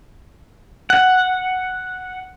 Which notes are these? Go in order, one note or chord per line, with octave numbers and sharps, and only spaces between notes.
F#5